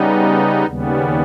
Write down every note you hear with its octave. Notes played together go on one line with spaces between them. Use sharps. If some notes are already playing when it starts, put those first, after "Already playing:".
Already playing: C#3 G3 B3 D#4
D#2 C#3 G3 B3